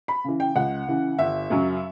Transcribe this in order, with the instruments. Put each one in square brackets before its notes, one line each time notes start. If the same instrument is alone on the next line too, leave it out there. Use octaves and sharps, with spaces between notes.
[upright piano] B5
C#3 E3
G5
C#2 F#5
C#3 E3
G1 E5
F#2 C#3 F#3